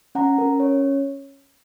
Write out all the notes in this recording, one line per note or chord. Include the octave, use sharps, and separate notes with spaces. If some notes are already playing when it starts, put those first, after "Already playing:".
C#4 F#5 A#5
C#4 A#4
C#4 C#5